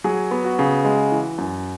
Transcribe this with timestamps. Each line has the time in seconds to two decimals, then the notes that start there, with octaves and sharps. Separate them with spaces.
0.04 F#3 G#4
0.31 B3
0.44 F#4
0.59 C#3
0.85 G#3
1.12 E3
1.38 F#2